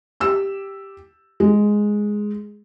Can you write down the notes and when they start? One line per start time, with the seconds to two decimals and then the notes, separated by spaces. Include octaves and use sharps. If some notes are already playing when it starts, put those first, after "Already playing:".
0.20 G4 E6
1.40 G#3